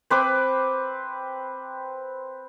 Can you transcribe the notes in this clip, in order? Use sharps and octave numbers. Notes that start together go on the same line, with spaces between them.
C4 B4 D6